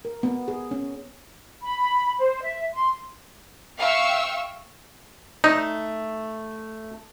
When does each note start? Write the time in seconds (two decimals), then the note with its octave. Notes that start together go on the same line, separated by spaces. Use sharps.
0.05 A#4
0.23 B3
0.48 G#4
0.71 C#4
1.62 B5
2.18 C5
2.42 E5
2.75 C6
3.78 E5 F5 G5 C#6 E6
5.44 A3 D#4